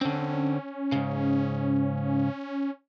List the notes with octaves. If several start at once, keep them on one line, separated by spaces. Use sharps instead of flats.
D3 C4 C#4
G#2 C#3